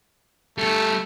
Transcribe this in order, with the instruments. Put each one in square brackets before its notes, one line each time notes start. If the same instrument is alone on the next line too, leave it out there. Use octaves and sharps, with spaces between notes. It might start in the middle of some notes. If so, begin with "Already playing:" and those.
[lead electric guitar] G3 A4 [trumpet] A3